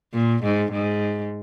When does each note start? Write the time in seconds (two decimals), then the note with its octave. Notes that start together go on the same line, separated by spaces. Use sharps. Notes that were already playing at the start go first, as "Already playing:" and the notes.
0.14 A#2
0.43 G#2
0.72 G#2